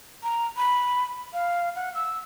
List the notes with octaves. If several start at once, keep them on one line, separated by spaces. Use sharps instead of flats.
A#5
B5
F5
F#5
E6